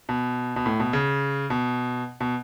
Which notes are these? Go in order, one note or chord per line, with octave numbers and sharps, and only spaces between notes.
B2
B2
A2
B2
C#3
B2
B2